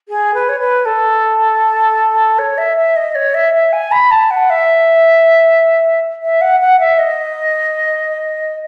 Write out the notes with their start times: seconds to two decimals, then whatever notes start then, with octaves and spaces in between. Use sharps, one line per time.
0.08 G#4
0.34 B4
0.49 C#5
0.59 B4
0.85 A4
2.38 C#5
2.57 E5
2.77 E5
2.96 D#5
3.15 C#5
3.34 E5
3.54 E5
3.72 G#5
3.91 B5
4.11 A5
4.30 F#5
4.50 E5
6.22 E5
6.41 F#5
6.60 F#5
6.79 E5
6.98 D#5